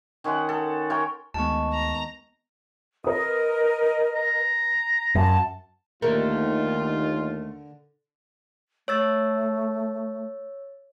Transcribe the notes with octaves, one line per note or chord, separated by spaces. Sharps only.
D#3 C#4 C5 F#5
A4
A#4 C#5 G5 G#5
D2 D#3 G#3 B3 A5 C#6
A#5
A#4 B4 D#5 D#6
A#5
F#2 A5
D#2 D3 A3 F4 A#4
A3 C#5 E6 A6